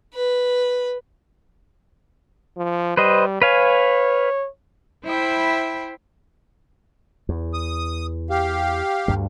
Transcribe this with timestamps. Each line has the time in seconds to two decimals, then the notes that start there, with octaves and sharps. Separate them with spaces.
0.14 B4
2.57 F3
2.97 G3 B4 C5 D#5
3.42 B4 C#5 F5 G#5
5.05 E4 C5 E5 G5 B5
7.29 E2
7.54 D#6
8.30 G4 F5
9.08 D2 G2 G3